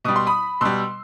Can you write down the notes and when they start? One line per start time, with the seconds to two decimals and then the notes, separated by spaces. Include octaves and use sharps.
0.04 B2 G3 D#6
0.16 C6
0.27 B5 D#6
0.61 B2 G3 C6 E6